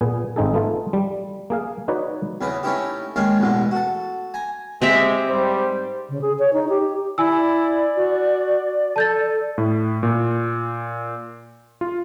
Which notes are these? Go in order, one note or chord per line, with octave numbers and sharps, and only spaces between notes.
A#2 B3 G#4
G#1 C4 D#4 G#4 A4
A3 B3 F4 A4
G3
A#3 G#4 F5
D#4 F#4 B4 C#5 D5
E2 C#3 E3 B4 D#5
A3 C#4 D#4 E4 G4
D#2 D#3 G#3 C#4 F5 G#5
A1 E2 B2 G#3
F#4 A4
G#5 A#5
G#3 C4 G4 E5
G#2 G3 C5
C#3
G#4
C#5
D#4
G4
E4 D5 G#5 E6
F#4
A4 A5 G6 A6
A2
A#2
F4